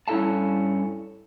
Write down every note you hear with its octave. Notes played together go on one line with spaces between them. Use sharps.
G2 C#4 E4 A4 F5 A5